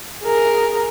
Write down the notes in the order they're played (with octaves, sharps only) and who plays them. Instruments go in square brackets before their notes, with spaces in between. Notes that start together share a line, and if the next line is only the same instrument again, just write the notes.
[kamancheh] G#4 A#4